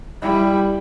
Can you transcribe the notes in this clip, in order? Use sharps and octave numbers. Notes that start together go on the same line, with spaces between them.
G3 E4